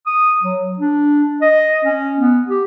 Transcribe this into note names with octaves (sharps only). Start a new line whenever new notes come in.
D#6
F#3
D4
D#5
C#4
B3
G4